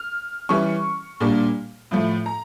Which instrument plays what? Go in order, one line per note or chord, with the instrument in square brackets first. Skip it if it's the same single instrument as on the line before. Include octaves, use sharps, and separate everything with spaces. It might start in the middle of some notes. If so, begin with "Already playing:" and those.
Already playing: [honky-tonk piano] F6
E3 G3 C#4 C#6
A#2 G3 A#3 D4
A2 F3 A3
A#5